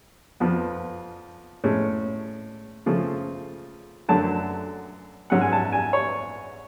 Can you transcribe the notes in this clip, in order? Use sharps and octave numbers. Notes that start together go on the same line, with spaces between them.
F2 F3 B3
A2 G#3 C#4
C#3 F3 A3
F#2 D3 F#3 A3 A5
G#2 F#3 C#4 F#5
G#5
A5
G#5
C#5